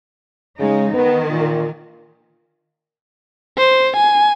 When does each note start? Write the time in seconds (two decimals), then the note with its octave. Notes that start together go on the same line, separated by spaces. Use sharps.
0.59 C#3 G#3 D#4
0.94 D#3 B3
1.30 A#2
3.58 C5
3.97 G#5